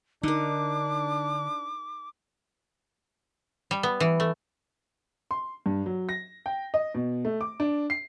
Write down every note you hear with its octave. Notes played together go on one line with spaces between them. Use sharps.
D3 D4 D#4 A#4 D6
G3
B3
E3
A3
C6
G2
F#3
A#6
G5
D#5
B2
A3
D6
D4
C7